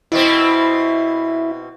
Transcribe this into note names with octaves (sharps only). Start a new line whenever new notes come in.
B2 B3 C4 E4